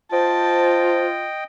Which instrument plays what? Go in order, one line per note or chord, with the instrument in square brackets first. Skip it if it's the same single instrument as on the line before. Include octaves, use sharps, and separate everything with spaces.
[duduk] F4 [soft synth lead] C5 [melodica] D#5 G5 [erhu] A5